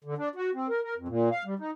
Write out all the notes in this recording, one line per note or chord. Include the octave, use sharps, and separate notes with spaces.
D3
D4
F#4
C4
A#4
A#4
F2
A#2
F5
G3
D#4